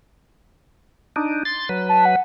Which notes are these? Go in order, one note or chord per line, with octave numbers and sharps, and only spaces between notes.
D4 D#4
C6 A6
F#3 B4
A5
F#5